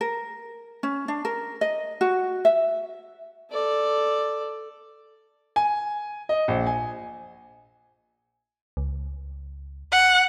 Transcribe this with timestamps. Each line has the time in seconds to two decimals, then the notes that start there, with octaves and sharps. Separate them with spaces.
0.01 A#4
0.83 C#4
1.08 D4
1.25 A#4
1.61 D#5
2.01 F#4
2.45 E5
3.51 A4 D5
5.56 G#5
6.29 D#5
6.48 A#1
6.67 G#5
8.77 C#2
9.92 F#5